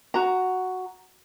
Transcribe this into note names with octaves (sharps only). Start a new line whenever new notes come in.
F#4 A#5